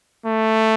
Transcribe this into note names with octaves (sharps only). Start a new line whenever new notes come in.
A3